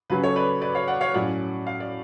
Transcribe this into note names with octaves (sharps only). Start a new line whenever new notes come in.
C#3 F#3 C#4 B4
A4 C#5
B4 D5
B4 D5
C#5 F5
D5 F#5
C#5 F5
A2 F#3 C#4 D5 F#5
F5
D5